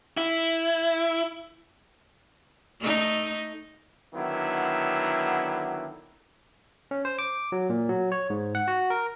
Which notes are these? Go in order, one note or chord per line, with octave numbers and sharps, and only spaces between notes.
E4
A3 D#4
D3 D#3 F#3 B3 E4
C#4
C5
D6
F#3
A#2
F#3
C#5
G#2
F#5
F#4
A#4